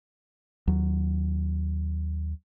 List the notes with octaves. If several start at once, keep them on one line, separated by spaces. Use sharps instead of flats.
D#2 F#3